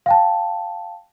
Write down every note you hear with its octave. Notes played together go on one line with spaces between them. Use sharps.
F5 G5 A5